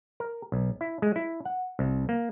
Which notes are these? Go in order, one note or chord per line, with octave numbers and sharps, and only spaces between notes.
A#4
B1
E4
G#3
E4
F#5
C2
A#3